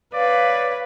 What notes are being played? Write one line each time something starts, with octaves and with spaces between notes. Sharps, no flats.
B4 C#5 D5 F5